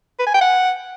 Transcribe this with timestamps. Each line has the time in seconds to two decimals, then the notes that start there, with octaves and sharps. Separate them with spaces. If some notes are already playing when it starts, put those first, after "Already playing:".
0.19 B4
0.27 G#5
0.34 G5
0.41 F#5